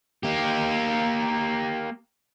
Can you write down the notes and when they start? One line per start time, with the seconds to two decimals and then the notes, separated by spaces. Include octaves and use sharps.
0.23 A#3 G4